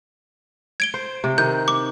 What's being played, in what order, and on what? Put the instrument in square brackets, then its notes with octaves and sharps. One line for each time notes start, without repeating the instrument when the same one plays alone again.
[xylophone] G#6 D7 G7
[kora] C5
C3
[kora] D#3 [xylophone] G6
[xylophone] D6